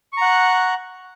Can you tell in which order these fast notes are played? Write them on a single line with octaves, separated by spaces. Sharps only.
C#6 A#5 F#5 F#6